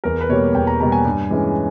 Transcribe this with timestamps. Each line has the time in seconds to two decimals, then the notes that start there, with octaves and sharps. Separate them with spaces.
0.04 E2 A#4
0.21 B4
0.29 B2 G3 A#3 C#5
0.54 E2 G5
0.67 A#5
0.80 B2 G3 A#3 A#5
0.92 G#5
1.05 G2
1.30 E3 G#3 C#4